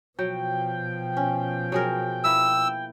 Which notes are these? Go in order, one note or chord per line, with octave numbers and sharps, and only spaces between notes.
B2 F3 F#3 G5
C#4
F#3 G#4 A#4
A#3 E4 E6